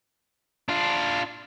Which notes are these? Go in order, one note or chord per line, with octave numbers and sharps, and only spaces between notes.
D4 F4